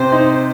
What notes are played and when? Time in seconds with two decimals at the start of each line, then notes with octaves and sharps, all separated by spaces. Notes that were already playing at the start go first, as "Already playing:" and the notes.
Already playing: C3 C5
0.12 D#4